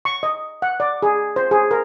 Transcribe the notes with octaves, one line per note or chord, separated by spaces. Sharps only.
C#6
D#5
F#5
D5
G#4
C5
G#4
A#4